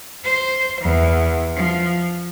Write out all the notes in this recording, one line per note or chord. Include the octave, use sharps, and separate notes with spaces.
C5
E2
F3